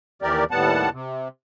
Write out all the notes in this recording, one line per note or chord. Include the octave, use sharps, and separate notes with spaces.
D#2 E3 G4 A#4 D5
D#2 A2 G3 B3 F#5 A5
C3